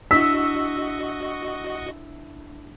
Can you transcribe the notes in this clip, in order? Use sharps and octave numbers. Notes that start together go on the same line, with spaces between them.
D4 E4 F#4 D#5 C#6 E6 B6